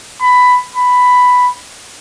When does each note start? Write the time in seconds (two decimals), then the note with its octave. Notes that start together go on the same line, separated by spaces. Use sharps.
0.22 B5
0.76 B5